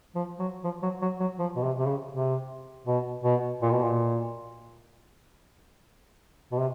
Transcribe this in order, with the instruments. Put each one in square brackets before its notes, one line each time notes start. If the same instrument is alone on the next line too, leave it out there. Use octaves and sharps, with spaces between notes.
[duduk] F3
F#3
F3
F#3
F#3
F#3
F3
B2
C3
C3
C#3
C3
B2
B2
A#2
B2
A#2
B2
C3